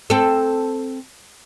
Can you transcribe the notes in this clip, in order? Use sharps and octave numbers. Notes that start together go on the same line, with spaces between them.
C4 A4